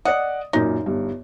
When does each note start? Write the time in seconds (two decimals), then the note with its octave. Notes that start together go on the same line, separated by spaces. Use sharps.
0.05 D5 D#5 F#5 D#6
0.53 F#2 A#2 D#4
0.86 G1 G2